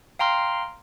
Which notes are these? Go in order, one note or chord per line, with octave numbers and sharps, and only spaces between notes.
F5 G5 A#5 C6 F6